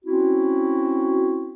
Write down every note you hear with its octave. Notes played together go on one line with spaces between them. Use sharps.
C4 C#4 E4 F#4